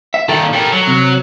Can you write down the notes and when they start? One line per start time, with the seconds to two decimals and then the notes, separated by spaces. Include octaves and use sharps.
0.14 E5
0.29 A#2 D#3 A4
0.54 G3 A#4
0.72 F#3
0.87 C3